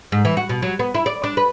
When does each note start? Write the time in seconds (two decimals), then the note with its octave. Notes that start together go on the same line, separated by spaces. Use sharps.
0.12 G#2
0.25 E3
0.37 F#4
0.49 B2
0.62 F#3
0.79 B3
0.95 E4
1.06 D5
1.24 D4
1.37 B4